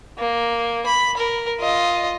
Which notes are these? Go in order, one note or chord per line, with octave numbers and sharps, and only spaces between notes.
A#3
B5
A#4
F4 D#5